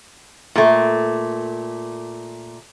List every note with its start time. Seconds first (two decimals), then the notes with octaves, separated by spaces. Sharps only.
0.56 A#2 A3